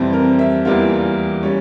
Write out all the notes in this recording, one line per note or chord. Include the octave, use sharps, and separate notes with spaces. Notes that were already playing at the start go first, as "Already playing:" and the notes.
Already playing: F2 C3 E3 G3 C4
A#4
E5
E2 E3 G3 A#3 F4
G3 C#4